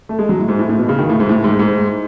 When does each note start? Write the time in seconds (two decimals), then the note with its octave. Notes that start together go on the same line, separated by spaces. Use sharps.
0.09 A3
0.19 G#3
0.29 F#3
0.39 A2
0.48 G#2
0.59 A2
0.69 A2
0.79 B2
0.89 C#3
0.99 D#3
1.10 A2
1.20 G#2
1.29 A2
1.44 G#2
1.59 G#2